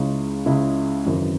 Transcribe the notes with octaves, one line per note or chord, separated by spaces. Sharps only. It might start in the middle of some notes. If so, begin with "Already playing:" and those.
Already playing: C#2 C#3 G#3 C#4 E4
C#2 C#3 G#3 C#4 E4
G#1 F#2 C#3 E3 C4